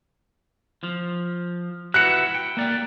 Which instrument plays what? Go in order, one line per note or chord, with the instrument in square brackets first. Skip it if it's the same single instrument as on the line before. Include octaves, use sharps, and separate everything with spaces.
[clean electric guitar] F3
[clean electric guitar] E4 F#4 B4 [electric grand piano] F#6 C#7
[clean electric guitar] G5
A#3 D5 G5